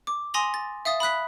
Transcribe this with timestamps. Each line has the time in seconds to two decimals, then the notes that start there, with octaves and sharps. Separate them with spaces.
0.07 D6
0.34 G#5 C6 D#6 A#6 F7 F#7
0.54 A6
0.85 E5 F5 D#6 A6
1.00 B5 D#6 F#6 B6